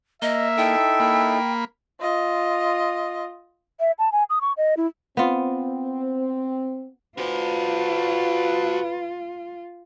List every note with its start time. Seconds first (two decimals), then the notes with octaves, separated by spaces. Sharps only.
0.22 A#3 D#5 E5
0.58 D#4 E4 A4 G5
1.00 A#3 B5
2.00 F4 D#5
3.79 E5
3.99 A5
4.12 G#5
4.30 D#6
4.41 C#6
4.57 D#5
4.77 E4
5.17 B3 C4 F4
7.18 F4 F#4 B4 C5